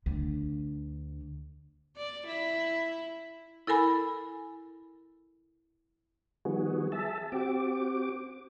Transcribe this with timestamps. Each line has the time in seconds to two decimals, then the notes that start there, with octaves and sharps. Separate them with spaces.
0.06 D2 D3
1.97 D5
2.27 E4
3.67 E4 A4 A#4 G#5 B5
6.45 D#3 F3 G3 B3 F#4 G#4
6.92 G#4 E5 A5
7.32 C4 F#4 G4 D6